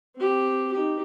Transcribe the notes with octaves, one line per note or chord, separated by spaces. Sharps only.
C4 G4
D#4 G4